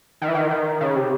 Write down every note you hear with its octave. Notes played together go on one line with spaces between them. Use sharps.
D#3
E3
D#3
D#3
C#3
C3